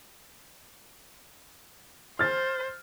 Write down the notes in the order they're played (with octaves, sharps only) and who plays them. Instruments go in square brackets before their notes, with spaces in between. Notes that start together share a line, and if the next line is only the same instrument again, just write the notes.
[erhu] C5 [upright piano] F6 A6